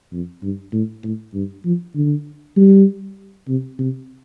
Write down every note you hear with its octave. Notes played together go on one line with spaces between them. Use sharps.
F2
G2
A2
A2
G2
F3
D3
G3
C3
C3